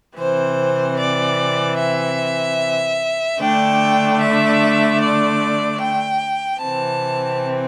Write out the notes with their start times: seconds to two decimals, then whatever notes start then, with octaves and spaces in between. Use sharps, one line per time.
0.17 C3 E3 C4 C5
0.98 D5
1.78 E5
3.40 D3 A3 D4 G5
4.20 E5
5.00 D5
5.80 G5
6.60 C3 E3 C4 A5